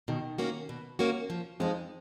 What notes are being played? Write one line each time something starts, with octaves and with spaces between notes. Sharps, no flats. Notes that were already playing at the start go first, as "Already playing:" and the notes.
B2 D#3
A#3 C#4 F#4
B2
A#3 C#4 F#4
F3
F2 F3 G#3 D#4